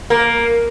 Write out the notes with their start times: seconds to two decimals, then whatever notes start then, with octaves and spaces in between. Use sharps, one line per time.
0.10 A#3